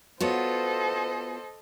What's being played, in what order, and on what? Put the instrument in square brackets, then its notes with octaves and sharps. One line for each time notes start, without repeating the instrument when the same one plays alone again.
[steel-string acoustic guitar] B3 F4 [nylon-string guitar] F#4 C#5 [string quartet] A4 D#5 [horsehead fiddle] C5